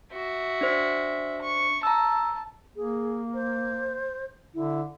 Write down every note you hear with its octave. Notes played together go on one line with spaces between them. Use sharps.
F#4 E5
D4 C5 B6
C#6
A5 A#5 E6
A#3 G#4
C5
D3 E4